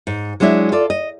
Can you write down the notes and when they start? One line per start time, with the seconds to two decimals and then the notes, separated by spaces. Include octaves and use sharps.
0.07 G#2
0.40 F#3 G#3 D4 E4 E5
0.72 F4 A4 D5
0.90 D#5